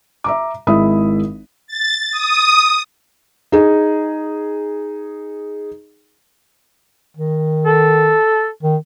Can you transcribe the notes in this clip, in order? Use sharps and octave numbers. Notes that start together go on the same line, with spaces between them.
E5 A#5 D6
G#1 G#3 E4 E5 B5 D#6
A6
D#6
D#4 G#4
D#3
A4
D#3